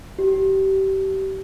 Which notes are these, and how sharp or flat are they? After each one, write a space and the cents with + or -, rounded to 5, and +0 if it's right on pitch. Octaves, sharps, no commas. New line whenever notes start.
G4 -30